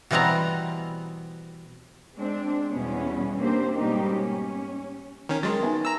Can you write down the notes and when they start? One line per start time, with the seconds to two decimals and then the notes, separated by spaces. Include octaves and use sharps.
0.11 B2 E3 G3 B3 C4 A#5
2.16 G#3 C4 D4
2.69 E2 B2 G3 B3 C#4
3.38 A#3 C4 D4 G4 C5
3.76 G#2 B2 G3 A#3 D#4 G4
4.11 C#4
5.29 D#3 C#4
5.43 F#3 G#3 A#4 G5 C6 A6
5.62 B3 D#4 B4 E5 G#5
5.85 A#5 E6